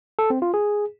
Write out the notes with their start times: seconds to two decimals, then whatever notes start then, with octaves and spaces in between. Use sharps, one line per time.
0.19 A4
0.30 C4
0.42 F4
0.54 G#4